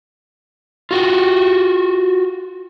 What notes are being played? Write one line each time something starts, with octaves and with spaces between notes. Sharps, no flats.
F4 F#4 G5